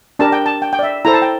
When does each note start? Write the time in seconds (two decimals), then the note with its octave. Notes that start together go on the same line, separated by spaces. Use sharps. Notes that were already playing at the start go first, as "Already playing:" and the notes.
0.19 D4 G4 A#4 A5
0.32 G5
0.46 A5
0.62 G5
0.73 G5
0.79 D5
0.83 E5
1.05 E4 A4 C5 A#5
1.14 A5
1.22 G5